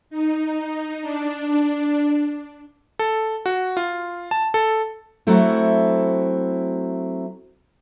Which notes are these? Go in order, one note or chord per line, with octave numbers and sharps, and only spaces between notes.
D#4
D4
A4
F#4
F4
A5
A4
F#3 A3 C4 E4